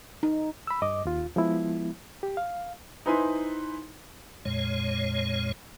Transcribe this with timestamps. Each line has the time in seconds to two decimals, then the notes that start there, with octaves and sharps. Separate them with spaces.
0.23 D#4
0.67 B5 E6
0.82 G2 D#5 D6
1.05 D#2 F4
1.36 F3 G#3 B3 E4
2.23 G4
2.37 F5
3.06 D#4 E4 B4 C5 G#5 C6
4.45 F2 A#2 G#3 C#5